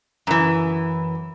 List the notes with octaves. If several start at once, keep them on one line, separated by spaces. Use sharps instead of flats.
F#2 E3